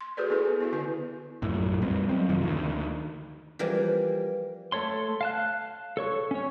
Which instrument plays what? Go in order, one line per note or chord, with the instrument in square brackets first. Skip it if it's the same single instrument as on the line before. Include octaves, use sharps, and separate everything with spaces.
[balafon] C6
F#4 G#4 A4 B4 C5 D5
B3 E4 G#4 A4 C5
B3
B3 E4 F#4
D3 B3 E4 B4
[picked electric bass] A#1 F#2 A2
F2 G3 B3 C4
F#3 C4
F1 F#2 D#3 F3
D2 D#3
[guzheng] E3 F3 G3 A#3
[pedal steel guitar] A3 A4 C#5 C6
F5 A5 F#6
A4 C#5 C#6
C#4 C#5